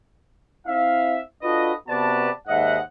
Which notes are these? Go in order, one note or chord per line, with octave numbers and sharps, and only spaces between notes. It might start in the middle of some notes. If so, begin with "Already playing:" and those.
C4 E4 E5 F5
D4 F4 F#4 A4 B4 D#5
C3 B3 F#4 B4 D5 A5
D#2 G#2 D#5 E5 F#5